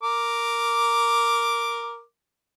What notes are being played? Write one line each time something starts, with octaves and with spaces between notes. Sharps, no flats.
A#4 D6